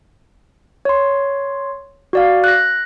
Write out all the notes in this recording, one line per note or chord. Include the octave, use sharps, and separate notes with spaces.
C#5 C6
F#4 D5 F5
F#6 A#6